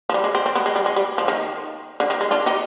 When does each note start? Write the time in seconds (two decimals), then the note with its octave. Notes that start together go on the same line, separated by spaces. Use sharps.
0.09 F3
0.14 G3
0.24 G#3
0.35 C4
0.46 C4
0.55 B3
0.66 G#3
0.76 G3
0.86 G#3
0.96 G3
1.18 F3
1.28 D#3
2.00 D3
2.10 D#3
2.21 G#3
2.31 D4 F4
2.46 D#4 G4